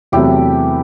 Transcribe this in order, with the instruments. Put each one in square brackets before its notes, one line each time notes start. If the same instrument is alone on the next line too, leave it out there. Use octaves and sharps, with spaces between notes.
[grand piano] E2 C3 F#3 A3 [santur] E4 G4